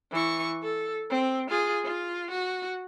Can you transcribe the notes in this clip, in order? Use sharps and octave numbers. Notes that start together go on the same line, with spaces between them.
E3 C#6
A4
C4
F4 G#4
F4
F#4